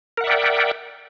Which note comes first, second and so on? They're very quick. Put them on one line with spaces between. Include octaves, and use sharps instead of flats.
A#4 F#5 E5 D5 G5